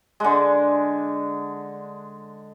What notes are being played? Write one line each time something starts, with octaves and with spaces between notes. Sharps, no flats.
D3 G#3